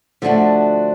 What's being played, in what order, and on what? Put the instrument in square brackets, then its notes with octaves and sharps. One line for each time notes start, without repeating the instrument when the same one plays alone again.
[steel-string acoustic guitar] D3 F3 A3 D4 F#4